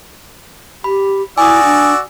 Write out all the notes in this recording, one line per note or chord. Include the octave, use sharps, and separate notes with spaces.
G4 B5
E4 F#4 D5 G#5 D#6 E6
D4